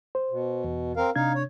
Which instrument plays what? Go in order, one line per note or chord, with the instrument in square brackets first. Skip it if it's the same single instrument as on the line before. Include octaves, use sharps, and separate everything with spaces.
[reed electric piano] C5
[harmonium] B2
[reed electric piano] E2
[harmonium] C4 A#4 F5
[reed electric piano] C3 D4 G#6 [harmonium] D#4 F5
[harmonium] C#5